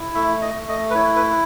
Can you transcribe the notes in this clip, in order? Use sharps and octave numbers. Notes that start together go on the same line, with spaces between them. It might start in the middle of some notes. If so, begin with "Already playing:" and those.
Already playing: E4
A3 E5
D#5
A3
D#5
B4
E4 C#5
B4